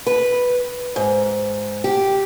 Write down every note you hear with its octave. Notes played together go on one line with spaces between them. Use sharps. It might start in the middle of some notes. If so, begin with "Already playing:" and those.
B4
G#2
G4